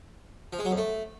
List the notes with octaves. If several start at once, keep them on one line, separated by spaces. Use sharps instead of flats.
F3
G#3
F#3
F2
A3